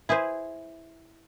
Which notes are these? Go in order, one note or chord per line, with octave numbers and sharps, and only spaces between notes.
E4 G#4 B4 C5